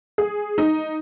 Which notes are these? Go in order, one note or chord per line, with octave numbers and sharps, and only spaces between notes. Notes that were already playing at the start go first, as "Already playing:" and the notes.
G#4
D#4